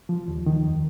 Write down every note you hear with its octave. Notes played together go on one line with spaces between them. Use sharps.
F3
D#2
D#3
F2